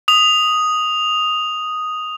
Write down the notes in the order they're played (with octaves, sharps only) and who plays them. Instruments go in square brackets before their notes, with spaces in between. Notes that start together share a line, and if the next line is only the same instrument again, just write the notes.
[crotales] D#6 F7